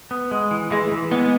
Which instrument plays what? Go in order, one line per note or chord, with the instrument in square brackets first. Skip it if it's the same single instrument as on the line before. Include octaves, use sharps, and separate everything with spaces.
[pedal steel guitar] B3
G#3
E3
[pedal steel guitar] E3 [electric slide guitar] G#3
[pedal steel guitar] E3
[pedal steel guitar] G#3 [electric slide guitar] B3